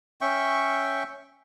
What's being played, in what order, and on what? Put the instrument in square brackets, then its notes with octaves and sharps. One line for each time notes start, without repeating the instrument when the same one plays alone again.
[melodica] C#4 E5 G5 C#6